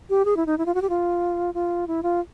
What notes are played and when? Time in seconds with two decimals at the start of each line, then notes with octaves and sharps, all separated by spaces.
0.10 G4
0.25 G#4
0.37 E4
0.46 D#4
0.58 E4
0.66 F4
0.75 F#4
0.82 G4
0.90 F4
1.54 F4
1.88 E4
2.03 F4